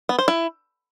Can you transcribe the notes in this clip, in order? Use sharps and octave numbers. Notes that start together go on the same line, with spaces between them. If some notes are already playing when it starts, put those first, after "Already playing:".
B3
C5
E4